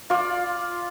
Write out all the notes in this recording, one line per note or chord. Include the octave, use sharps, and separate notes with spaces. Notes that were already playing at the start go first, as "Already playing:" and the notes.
F4 D5